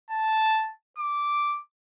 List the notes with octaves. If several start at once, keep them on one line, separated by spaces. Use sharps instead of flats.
A5
D6